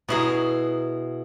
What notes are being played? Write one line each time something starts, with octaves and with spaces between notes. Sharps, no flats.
B2 E4 G#4